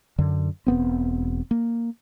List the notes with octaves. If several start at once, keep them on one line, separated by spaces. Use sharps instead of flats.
F#2 D3
E1 B3 C4
A#3